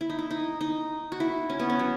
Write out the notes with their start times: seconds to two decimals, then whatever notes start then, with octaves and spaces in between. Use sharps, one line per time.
0.01 E4
0.10 D#4
0.19 E4
0.31 D#4
0.61 D#4
1.12 F#4
1.20 E4
1.50 C#4
1.59 B3
1.70 C#4
1.79 F#3